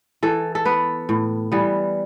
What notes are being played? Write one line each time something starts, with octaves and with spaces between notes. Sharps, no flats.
E3 A4
A4
B3 B4
A2
E3 G3 B3